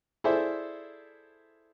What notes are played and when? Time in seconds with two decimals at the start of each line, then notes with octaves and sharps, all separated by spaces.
0.24 E4 G#4 A4 C5 D5 E5